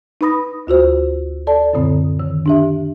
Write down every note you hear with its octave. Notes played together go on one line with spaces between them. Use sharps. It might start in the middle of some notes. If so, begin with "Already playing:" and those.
D#4 B4 B5 D#6 A#6
D2 F4 F#4 C5
A4 D5 A5
F#2 A#2 D3 C4
D#3
D4 G4 E5